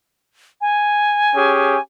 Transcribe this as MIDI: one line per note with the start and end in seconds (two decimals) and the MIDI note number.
0.61 1.81 80
1.35 1.76 61
1.35 1.76 67
1.35 1.76 68